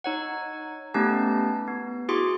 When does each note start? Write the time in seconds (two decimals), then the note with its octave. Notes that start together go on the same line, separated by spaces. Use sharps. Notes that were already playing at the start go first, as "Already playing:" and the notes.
0.04 D#4 C#5 F#5
0.94 A3 B3 C#4 D#4 G4 A5
1.68 B3
2.09 E4 F#4 G#4 C6 D6